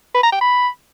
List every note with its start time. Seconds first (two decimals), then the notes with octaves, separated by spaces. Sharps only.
0.15 B4
0.24 A#5
0.32 G5
0.41 B5